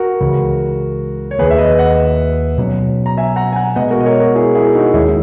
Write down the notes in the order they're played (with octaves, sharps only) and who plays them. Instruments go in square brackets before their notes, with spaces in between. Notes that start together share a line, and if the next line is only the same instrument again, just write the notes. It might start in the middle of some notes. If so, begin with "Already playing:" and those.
Already playing: [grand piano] F#4 A#4
[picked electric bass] C#2 C#3 E3
[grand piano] C#5
[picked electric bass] D#2 D#3 A#3 [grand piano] G#4 B4
[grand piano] E5
B4 D#5
D#5 F#5
[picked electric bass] B2 F#3 C#4
[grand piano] A#5
E5 G#5
F#5 A#5
G#5
F#5 A#5
[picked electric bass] B2 G#3 B3 [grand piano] D#5 F#5
[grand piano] F#4 A#4
D#5
A#4 C#5
F#4 A#4
E4 G#4
E4 G#4
D#4 F#4
[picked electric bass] D#2 D#3 G#3 C#4 [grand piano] E4 G#4